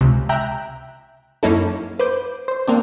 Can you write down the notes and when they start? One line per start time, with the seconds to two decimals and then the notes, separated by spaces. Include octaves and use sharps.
0.01 C#2 C3
0.29 E5 G5 A#5 F#6 G6
1.43 F#2 A#3 C#4 D#4 E4 A4
1.99 B4 C5 D6 G6
2.48 C5
2.68 A#3 C4 D4